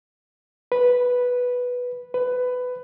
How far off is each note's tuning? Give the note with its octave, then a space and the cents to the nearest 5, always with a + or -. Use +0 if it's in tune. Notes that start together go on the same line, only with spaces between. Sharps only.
B4 -5
B4 +15